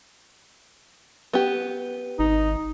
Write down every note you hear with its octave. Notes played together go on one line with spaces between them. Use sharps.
B3 G4
G#1 D#4